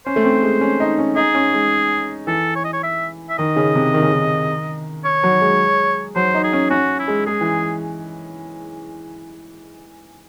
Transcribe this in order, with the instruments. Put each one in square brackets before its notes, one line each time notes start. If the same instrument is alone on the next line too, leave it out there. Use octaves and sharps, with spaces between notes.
[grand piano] C#4 [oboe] C5
[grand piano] A3
C4
G#3
C#4
D#4
C#4
[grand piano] D#4 [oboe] G#4
[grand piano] C#4
G#3
[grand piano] E3 [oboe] A4
[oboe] C#5
D#5
C#5
E5
E5
[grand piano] D#3 [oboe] D#5
[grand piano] C#3
C3
D#3
C#3
D#3
[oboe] C#5
[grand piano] F#3
G#3
[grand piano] F#3 [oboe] C5
[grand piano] D#4
[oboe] G#4
[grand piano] C#4
[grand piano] C#4 [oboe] F#4
[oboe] E4
[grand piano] G#3
[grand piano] G#3 [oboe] G#4
[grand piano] E3